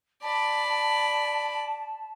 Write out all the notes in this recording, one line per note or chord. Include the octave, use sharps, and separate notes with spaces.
D5 A5 B5